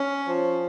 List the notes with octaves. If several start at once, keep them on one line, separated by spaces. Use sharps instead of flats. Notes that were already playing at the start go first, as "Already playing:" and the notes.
Already playing: C#4
F3